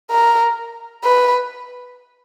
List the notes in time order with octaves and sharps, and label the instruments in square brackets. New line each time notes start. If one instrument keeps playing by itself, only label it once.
[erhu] A#4
B4